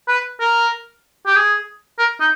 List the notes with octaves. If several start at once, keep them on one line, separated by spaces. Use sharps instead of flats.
B4
A#4
G4
G#4
A#4
D#4